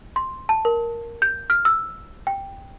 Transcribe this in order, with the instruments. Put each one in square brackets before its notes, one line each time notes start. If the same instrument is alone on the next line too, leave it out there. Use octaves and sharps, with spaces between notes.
[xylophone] C6
A5
A#4
G6
F6
E6
G5